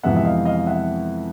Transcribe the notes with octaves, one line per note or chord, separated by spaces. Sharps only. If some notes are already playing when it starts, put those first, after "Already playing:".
F2 C3 E3 G#3 B3 E5 F#5
E5
D#5 F5
D#5 F5
E5 F#5